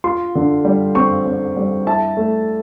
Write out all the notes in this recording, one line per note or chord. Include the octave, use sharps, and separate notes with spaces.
F4 C6
D3
G3
C4 C#6
C4
G3
E4 A5
A3